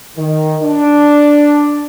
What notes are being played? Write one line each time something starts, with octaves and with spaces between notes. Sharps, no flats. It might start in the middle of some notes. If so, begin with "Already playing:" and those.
D#3
D4